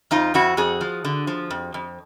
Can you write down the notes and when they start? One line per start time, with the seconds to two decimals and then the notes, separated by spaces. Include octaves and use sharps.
0.11 F2 D#4 F4
0.34 F2 E4 F#4
0.57 F2 F#4 G#4
0.81 F3
1.05 D3
1.27 F3
1.50 F2
1.74 F2